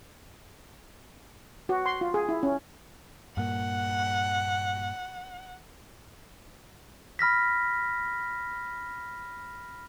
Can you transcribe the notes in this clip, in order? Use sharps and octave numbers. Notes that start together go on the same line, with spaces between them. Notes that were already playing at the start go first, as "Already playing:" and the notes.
F#4
C6
F4
G#4
E4
C#4
G2 A#2 A#3 F#5
B5 F6 A#6 B6